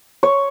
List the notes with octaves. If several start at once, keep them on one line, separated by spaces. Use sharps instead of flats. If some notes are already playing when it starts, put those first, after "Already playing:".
C#5